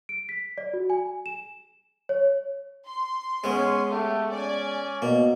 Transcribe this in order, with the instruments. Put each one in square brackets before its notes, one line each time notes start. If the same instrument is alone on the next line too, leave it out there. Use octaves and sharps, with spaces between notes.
[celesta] D7
B6
D5
F#4
G#5
E7
C#5
[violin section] C6
[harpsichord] G#3 B3 [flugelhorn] C#4
[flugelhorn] A3 [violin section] G4
[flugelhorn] C#4 [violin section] D5 G#5
[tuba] B2 [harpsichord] A#3